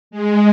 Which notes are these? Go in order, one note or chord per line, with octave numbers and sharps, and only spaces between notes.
G#3